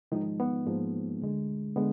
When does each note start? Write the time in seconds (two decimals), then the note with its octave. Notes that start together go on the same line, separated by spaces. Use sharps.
0.12 G#2 D#3 F3 G#3 D#4
0.40 B3
0.66 G#2 F3 G#3 A#3
1.22 D2 D3 G#3
1.76 D3 G#3 B3